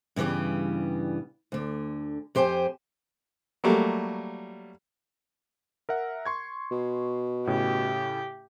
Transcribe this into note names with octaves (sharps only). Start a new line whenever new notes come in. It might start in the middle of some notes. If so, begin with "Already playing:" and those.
G2 C#3 E3 G3 B3
D2 D3
F2 G4 C5 G5 G#5
F#3 G3 A3 A#3
A#4 E5 F#5
C6 C#6 G#6
B2
A2 C#3 G4